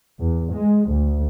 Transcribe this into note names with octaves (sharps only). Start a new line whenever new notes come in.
E2
G#3
D2